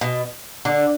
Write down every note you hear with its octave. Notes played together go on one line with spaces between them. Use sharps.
B2
D3